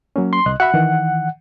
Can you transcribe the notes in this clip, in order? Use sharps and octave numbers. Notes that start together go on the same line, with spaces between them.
F#3 A#3 C#4
C6
C2 D#5 F#6
F#4 E5 F#5 B5
D#3 E3